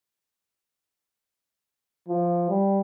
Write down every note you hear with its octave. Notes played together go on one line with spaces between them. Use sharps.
F3
G3